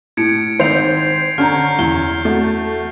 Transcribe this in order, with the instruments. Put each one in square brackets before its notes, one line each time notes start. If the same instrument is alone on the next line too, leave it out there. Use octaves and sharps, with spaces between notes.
[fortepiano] A2 [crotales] G#6 C#7 D7
[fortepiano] G#1 [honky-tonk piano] C5 [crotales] C7 F7
[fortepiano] D3 [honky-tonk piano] C#4 A#5 [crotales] F6 G6
[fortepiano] E2 [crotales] G7
[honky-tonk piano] A3 F#4